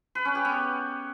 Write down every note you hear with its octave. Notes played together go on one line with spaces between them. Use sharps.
B4
C#4
G4
B3